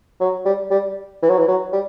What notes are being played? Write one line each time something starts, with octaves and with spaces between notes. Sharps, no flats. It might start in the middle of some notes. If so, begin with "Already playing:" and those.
F#3
G3
G3
E3
F#3
E3
F#3
G3